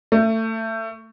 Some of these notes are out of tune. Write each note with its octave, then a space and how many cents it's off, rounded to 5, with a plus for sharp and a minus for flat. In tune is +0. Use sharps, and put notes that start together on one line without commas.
A3 +25